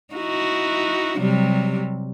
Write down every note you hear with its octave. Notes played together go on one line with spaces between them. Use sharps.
D#4 E4 F#4
C3 F#3 G3